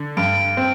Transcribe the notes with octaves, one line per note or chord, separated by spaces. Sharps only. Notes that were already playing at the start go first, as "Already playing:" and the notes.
Already playing: D3
G2 D7
C4